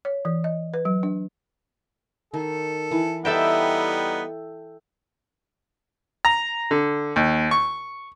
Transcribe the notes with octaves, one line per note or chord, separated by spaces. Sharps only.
C#5
E3
D#5
B4
F#3
D4
D#3 A4
E3
G3 B3 D#4 A4 D5 E5 G5
A#5
D3
D#2
C#6